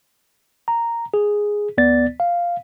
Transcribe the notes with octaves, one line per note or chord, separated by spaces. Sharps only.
A#5
G#4
D2 B3 D5 A6
F5